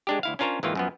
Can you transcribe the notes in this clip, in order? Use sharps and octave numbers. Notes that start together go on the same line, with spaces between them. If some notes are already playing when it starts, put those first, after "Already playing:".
G#3 D4 G4
D2 E4 F5
C#4 D4 F4 A#4 C5 C#5
G#1 D#3 E3 A#3 F4
F#2 F3 B3